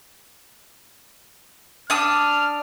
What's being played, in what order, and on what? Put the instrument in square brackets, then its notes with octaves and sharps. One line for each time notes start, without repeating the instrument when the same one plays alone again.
[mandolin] D4 D#6 [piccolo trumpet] F6